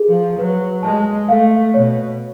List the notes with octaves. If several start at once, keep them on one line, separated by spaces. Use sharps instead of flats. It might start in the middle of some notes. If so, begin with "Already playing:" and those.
Already playing: G#4
F3
F#3 B4
G#3 A5
A3 F5
B2 C#5